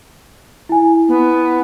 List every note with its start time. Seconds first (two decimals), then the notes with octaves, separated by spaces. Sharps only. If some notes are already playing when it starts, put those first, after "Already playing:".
0.69 E4 G#5
1.08 B3